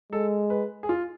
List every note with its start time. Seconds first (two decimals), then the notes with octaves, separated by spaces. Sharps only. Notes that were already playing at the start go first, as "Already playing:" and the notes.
0.12 G#3 A4
0.50 B4
0.83 G#4
0.89 F4